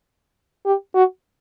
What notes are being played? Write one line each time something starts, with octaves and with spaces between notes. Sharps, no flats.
G4
F#4